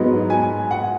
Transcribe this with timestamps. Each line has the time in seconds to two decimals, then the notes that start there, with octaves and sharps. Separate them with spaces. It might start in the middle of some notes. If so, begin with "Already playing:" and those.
Already playing: G#2 F#3 B3 D#4
0.30 G#5
0.71 F#5